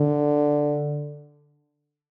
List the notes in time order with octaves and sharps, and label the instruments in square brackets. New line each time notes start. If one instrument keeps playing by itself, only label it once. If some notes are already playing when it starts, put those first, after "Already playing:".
Already playing: [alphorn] D3